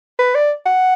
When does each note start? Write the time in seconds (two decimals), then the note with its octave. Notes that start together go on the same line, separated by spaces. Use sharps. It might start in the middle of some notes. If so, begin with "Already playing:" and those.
0.19 B4
0.35 D5
0.66 F#5